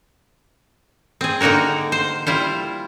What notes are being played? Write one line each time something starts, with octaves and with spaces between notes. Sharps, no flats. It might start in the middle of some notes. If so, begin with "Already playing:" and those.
C4 G#4
D3 A#3 D#4 F#4 A#4
C5
G3 E4 F4 C5